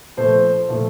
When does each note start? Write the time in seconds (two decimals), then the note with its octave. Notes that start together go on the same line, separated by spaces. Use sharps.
0.17 A#2 F3 A3 C5
0.69 A#2 F3 A3